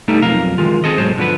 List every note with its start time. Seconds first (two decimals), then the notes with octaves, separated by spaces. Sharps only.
0.08 G3 A3 B3 D#4 A4
0.22 B1 F2 A#4 F5
0.58 D#3 G#3 F4
0.84 C4 G#4 A4 D#5
0.98 B1 G#2 F#3 G#3 A4 C5
1.18 D3 F3 B3 B4